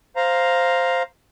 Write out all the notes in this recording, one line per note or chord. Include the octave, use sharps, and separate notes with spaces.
C5 F5 A#5